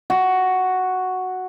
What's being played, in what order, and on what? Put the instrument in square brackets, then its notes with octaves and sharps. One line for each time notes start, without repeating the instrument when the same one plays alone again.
[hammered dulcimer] F#4